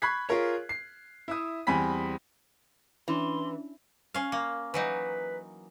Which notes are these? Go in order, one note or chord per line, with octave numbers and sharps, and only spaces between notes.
B5 C#6 F#6 G#6 B6 C7
F4 G#4 A#4 C#5
C7
E4 E5 D#6
E2 G3 C4 G#5 B5 B6
E3 C#4 D4 C6
C#4 F5
A#3
E3 F#3 D#4 B4